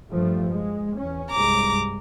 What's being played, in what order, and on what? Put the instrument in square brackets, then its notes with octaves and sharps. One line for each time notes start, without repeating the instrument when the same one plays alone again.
[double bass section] G2 F3 A3
G#3
E2 C#4
[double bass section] C2 G2 G#3 [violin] A#5 D6